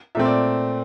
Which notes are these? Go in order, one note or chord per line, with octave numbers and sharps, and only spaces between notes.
A#2 A3 C4 E5
D5